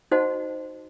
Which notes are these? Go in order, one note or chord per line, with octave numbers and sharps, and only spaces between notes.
D#4 F#4 C5 D#5 F#5 A5